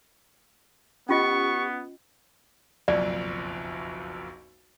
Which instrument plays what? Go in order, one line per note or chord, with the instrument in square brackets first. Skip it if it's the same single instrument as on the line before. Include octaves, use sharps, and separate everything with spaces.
[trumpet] B3 [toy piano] C#4 F4 D#5 [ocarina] G4 [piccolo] C#6
[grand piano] F#1 B1 F2 [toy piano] D5